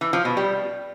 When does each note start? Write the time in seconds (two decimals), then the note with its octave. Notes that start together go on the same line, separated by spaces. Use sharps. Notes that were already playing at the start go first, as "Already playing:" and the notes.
0.01 E3
0.13 F3
0.25 B2
0.37 G3